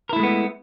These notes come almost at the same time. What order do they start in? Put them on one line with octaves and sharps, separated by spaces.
A#4 E4 A3 G#3 B3